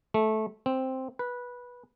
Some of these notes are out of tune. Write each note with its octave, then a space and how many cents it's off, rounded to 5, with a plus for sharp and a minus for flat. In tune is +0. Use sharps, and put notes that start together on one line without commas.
A3 -15
C4 +0
B4 -15